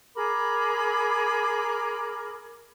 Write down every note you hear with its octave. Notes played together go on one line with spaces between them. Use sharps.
G#4 A#4 B5 D6